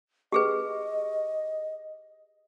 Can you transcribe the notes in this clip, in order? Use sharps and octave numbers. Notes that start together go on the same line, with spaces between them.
G4 G#4 B4 D#5